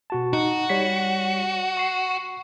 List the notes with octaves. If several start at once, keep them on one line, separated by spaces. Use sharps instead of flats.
B2 F#4 A5
D#4 F#4
G3 C#5 B6
C#6 C7